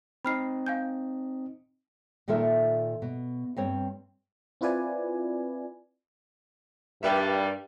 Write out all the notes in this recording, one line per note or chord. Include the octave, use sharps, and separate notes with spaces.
C4 D#4 D#5 B5 F6 C7
F5 G#5 G6
A#2 D#3 F4 A4 A#4 E5
B2
G2 C4 C#5
C4 E4 F4 B4 D5 G#5
G2 D#3 G3 G4 B4 E5